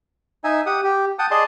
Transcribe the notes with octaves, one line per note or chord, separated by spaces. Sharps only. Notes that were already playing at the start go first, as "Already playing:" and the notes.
D#4 E5 G#5
G4 F#5 D#6
G4
F#5 G5 A5 D#6
G#4 D5 D#5 A5 C6